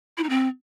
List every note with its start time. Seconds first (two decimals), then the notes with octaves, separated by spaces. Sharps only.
0.18 E4
0.23 D#4
0.29 C4